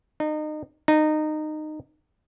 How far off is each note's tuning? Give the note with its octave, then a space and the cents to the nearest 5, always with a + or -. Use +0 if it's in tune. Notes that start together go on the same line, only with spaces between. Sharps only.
D#4 -30
D#4 -20